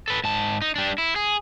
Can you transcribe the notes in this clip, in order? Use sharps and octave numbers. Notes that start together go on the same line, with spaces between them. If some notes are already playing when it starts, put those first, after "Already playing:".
A4 B4
G#2 A5
D#4
G3 D4
E4
G#4